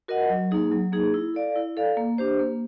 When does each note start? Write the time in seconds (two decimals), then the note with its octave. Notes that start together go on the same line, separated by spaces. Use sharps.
0.08 F#4 A#4 D#5 F#5
0.29 F#3
0.51 A#3 D#4 G#4
0.71 F#3
0.92 A#3 D#4 G#4
1.14 E4
1.34 A4 D5 F5
1.56 E4
1.77 A4 D5 F5
1.97 A#3
2.18 D4 G4 C5
2.39 A#3